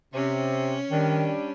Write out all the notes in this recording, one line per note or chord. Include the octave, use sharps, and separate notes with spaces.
C3 C#4
D#3 G3 D4